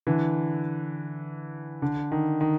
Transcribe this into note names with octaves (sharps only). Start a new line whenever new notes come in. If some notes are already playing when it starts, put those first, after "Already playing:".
D3 E3
D3
D#3
D#3